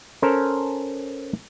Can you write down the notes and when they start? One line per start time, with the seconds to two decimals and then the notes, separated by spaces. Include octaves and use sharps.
0.22 C#4 A4 A#4 C5